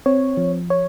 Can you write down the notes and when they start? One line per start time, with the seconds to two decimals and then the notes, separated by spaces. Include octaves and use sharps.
0.06 C4 C#5
0.37 F3
0.70 C#5